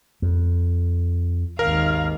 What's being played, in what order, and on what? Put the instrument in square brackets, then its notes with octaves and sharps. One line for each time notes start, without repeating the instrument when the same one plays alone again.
[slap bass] F2
[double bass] G#1 D#2 [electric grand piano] A#4 [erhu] F5